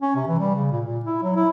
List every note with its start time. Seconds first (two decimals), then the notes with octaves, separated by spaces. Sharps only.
0.02 C#4
0.15 C3
0.27 E3
0.39 G3
0.54 C#3
0.71 A#2
0.85 A#2
1.05 E4
1.23 F#3
1.36 E4